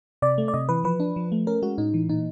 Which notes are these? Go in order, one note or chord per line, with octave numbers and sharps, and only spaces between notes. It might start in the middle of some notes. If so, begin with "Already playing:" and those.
C3 D5
A3
D5
C3 D#5
E3 B4
F3 B4
D4
F3
A3
C#4 A#4
G#3 F#4
A2 D#4
E3
A#2 D#4